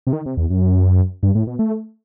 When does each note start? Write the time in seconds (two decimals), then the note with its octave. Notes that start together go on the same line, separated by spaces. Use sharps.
0.07 C3
0.13 D#3
0.26 C3
0.37 E2
0.50 F#2
1.23 G2
1.35 A2
1.47 B2
1.59 A3